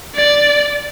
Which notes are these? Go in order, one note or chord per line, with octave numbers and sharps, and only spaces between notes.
D5